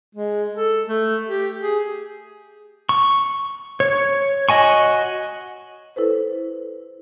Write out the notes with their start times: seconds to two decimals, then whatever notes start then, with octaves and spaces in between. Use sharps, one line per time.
0.15 G#3
0.57 A4
0.88 A3
1.29 G4
1.61 G#4
2.89 C#6
3.80 C#5
4.49 F#4 D#5 G#5 C#6
5.96 E4 A4 B4 C5